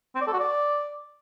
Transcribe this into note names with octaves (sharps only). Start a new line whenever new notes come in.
C4
D5
A4
F#4
D5